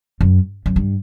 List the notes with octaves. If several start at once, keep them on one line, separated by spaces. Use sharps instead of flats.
F#2
F#2
G2